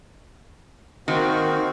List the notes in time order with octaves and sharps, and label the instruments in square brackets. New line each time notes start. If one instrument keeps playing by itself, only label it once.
[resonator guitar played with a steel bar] D#3 [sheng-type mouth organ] A#3 C4 F#4